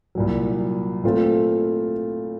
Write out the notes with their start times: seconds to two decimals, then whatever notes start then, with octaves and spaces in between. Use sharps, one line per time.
0.15 C2 A#2 F#3
1.03 A#2 A3 C4 F4